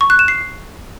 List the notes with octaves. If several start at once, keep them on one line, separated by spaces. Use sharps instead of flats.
C#6
F#6
E7
C7